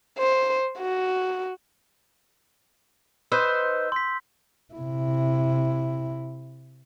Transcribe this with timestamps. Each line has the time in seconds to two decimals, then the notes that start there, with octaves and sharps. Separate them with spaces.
0.18 C5
0.79 F#4
3.32 D#4 B4 C5 E6 G6
3.92 C6 B6
4.74 C3 E4